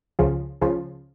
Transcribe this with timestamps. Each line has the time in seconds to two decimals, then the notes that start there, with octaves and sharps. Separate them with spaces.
0.19 C#2 C#3 F3
0.61 C#2 C#3 F3